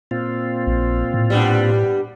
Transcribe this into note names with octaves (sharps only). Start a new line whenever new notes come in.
A#2 C4 F4
A#1
A2
G3 B3 D4